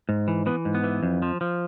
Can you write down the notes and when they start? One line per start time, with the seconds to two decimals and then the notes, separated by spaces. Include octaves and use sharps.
0.09 G#2
0.28 E3
0.46 E3 B3
0.65 G#2
0.75 B3
0.84 E3
1.03 F2
1.22 F3
1.41 F3